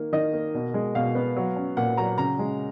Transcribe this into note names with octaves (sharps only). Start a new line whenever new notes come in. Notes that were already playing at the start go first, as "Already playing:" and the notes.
Already playing: D#3 A#3
D#3 D#5
A#3
B2
G#3
B2 F5
B3
F#3
C#4
A#2 F#5
F#3 A#5
C#3 A#5
G#3